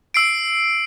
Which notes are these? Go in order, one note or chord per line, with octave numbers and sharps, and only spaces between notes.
E6 C7 D7